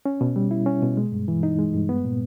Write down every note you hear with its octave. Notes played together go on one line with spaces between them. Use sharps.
C#4
B2
G3
E4
C#4
B2
G#3
G2
E3
D#4
G#3
G2
B3
A#2